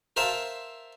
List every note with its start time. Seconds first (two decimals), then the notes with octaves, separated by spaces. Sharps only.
0.16 A#4 C5 E5 F5 A5